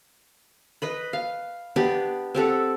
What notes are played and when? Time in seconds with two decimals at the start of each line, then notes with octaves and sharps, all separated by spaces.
0.82 B4 D#5 B5
1.13 F5
1.76 B3 D4 G4
2.34 C4 G4 A4 F#5